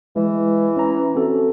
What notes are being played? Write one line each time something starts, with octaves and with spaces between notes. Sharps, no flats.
E3 G#3
C#4 A#5
C4 F#4 A4